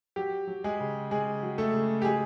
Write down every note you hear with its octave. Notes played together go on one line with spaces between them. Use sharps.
F#3 G4
F#3
G#3 G#4
C#3
C#3 G#3 G#4
F#3
A3 A4
C#3
G4
F#3 G#3 G#4